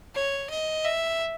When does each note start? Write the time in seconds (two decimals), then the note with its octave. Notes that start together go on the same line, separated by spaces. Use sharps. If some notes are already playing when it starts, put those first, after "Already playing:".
0.15 C#5
0.50 D#5
0.85 E5